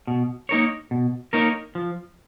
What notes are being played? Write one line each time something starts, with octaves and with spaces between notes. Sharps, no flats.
B2
A#3 D#4 A#4 C#5
B2
A#3 D#4 A#4 C#5
F3